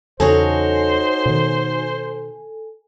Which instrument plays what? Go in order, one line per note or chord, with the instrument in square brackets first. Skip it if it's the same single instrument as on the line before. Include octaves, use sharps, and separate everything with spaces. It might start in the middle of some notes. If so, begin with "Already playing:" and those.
[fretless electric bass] E2 C#3 [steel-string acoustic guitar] D#4 F#4 C#5 [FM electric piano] A4 G#5 [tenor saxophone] C5
[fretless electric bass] B2 D#3